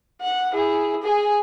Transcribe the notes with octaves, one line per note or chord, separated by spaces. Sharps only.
F#5
E4 G#4
G#4 G#5